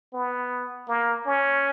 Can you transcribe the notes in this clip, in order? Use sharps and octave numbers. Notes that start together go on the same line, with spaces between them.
B3
A#3
C#4